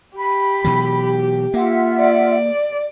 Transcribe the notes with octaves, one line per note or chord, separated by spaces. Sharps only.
G4 B5
B2 E3 F#3
A#3 F4 E5 F#5
D5